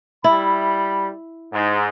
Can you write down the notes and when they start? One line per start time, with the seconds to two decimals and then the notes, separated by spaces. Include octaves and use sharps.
0.24 G3 E4 B5
1.53 G#2